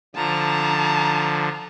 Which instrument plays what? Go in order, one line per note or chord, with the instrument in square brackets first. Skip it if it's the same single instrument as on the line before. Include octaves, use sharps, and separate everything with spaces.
[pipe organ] D3 F3 [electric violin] A5 A#5